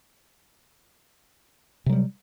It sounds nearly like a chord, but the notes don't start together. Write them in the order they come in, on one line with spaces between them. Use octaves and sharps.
C3 F#3 G3